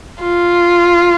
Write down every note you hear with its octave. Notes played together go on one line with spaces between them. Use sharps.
F4